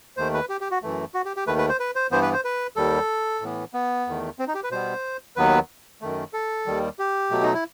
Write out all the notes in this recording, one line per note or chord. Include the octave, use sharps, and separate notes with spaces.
D#2 D#3 A3 C5
B4
G4
G4
F#4
F#2 E3 A3
F#4
G4
G4
D#2 D#3 A3 B4
B4
C5
B4
C5
G2 E3 B3 C5
B4
C5
B4
D#2 D#3 G3 A4
A2 E3 B3
B3
E2 D#3 A3
C4
D#4
G4
B4
B2 G3 B3 C5
D#2 D#3 F#3 B3 B4
F#2 D#3 A3
A4
D#2 D#3 G3
G4
B2 F#3 A3
D#4
E4